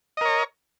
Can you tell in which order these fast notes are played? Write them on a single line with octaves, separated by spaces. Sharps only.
D#5 A#4 C#5